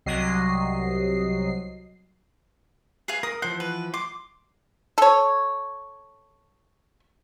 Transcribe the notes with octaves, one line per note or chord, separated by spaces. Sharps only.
C2 C3 F#3 D#5 C7
G#4 B4 F5
A#4 D#6
E3 F3 C5 F#5
B4
C6 D6
A4 C#5